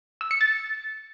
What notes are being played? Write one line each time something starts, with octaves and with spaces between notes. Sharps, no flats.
E6
C#7
A6